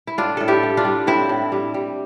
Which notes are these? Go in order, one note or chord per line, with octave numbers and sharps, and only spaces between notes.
E4
A2 D4 F4
A2 A4
E4 G4
G3
D4 F4
G3
A2 C4 E4
A2
G3
G3